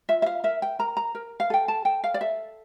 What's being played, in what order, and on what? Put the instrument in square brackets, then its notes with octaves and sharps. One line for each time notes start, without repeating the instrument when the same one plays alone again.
[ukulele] F4 E5
E5
F5
A#4 E5
G5
A#4 A#5
A#5
A#4
F5
A4 G5
A5
A4 G5
F5
D5
A4 E5